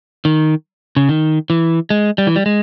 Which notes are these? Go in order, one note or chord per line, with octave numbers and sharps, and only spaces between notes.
D#3
C#3
D#3
E3
G#3
G3
E3
G3
G#3